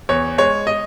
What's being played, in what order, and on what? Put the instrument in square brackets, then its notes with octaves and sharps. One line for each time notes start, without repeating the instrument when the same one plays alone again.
[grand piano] E2 C#5
G#3 C#5
D#5